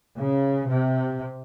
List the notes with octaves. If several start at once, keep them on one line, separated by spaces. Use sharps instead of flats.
C#3
C3